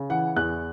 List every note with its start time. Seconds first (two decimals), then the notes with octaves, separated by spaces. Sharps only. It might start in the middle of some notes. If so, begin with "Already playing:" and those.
Already playing: C#3
0.09 E3 F#5
0.36 E2 F#6